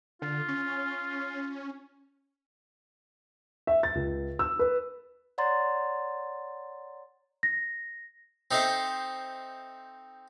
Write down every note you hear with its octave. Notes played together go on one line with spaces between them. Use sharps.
D3 F4
C#4
E5
A6
C#2
E6
B4
C#5 D5 F#5 A#5 C6 A6
A#6
C4 D#4 A4 C5 E5 A5